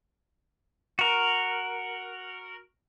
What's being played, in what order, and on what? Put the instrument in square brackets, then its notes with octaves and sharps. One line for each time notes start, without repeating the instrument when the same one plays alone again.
[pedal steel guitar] F#4 A#4